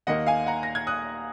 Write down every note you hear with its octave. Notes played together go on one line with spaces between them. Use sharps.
D#2 D#3 A#3 D#5 F#5
F5 G#5
F#5 A#5
A#6
G#6
D#6 F#6